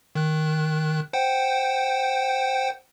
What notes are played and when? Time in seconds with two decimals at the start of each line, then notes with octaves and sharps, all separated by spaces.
0.15 D#3 F#6
1.13 C5 F#5 G5